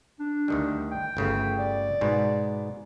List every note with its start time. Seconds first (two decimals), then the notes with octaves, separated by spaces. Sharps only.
0.19 D4
0.48 D2 D#3 G3
0.91 G5
1.17 G1 C#3 A3
1.59 D5
2.01 G#2 B2